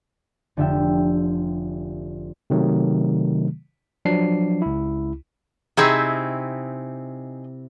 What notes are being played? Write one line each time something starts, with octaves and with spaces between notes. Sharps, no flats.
F1 D3 F3 G4 E5 G5
C3 D#3 F#3 A3
F3 F#3 D4 C7
C#2 E4
C3 C4 D#4 E4 G#4 C#6